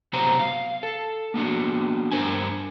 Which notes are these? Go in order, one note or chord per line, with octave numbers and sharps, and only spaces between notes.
C3 F#3 B3 F#4 C5 A#5
F5
A4
A#3 B3 D4 F#4
G2 C3 D4 A#4 C5 G#5